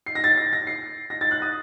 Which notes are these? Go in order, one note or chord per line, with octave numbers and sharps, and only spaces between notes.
C7
A#6
A6
A#6
A#6
C7
A#6
A6
F#6
D#6